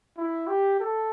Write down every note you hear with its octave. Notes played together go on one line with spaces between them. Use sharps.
E4
G4
A4